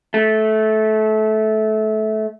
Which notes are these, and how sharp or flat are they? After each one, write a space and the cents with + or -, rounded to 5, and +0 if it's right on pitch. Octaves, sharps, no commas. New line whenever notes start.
A3 -20